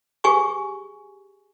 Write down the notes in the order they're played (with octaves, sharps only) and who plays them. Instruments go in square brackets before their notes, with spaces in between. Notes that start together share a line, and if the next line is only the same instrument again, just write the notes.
[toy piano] G4 G#4 G#5 C#6 D6